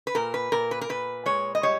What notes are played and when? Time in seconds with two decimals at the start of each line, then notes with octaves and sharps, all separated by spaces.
0.07 B4
0.15 A#2 A#4
0.34 B4
0.52 A#2 A#4
0.71 B4
0.81 A#4
0.89 A#2 B4
1.26 G#3 C#5
1.55 D#5
1.63 G3 C#5